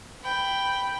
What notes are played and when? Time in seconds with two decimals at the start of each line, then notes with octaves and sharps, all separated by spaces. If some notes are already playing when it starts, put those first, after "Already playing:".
0.22 G5 B5